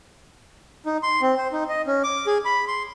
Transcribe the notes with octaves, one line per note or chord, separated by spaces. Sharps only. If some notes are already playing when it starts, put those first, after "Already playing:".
D#4
C6
C4
C5
D#4
D#5
C#4
D6
G#4
B5
C6